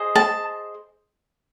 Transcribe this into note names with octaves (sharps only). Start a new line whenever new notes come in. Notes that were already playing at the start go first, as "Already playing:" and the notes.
Already playing: G#4 C5 D#5
A5